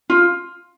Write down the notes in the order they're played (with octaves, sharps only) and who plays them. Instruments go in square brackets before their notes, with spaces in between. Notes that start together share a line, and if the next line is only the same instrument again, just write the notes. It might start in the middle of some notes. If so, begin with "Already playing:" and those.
[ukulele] F4